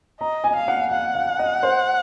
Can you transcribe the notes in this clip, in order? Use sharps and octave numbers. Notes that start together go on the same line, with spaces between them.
D#5 A#5
G#5
F5
F#5
F5 F#5
F5
D#5
C5